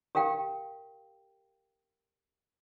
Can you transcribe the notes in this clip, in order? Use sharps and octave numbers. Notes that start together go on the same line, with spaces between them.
G4 A#4 F5 G5